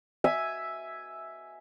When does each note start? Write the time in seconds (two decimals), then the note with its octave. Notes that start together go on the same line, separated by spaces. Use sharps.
0.24 E5 G#5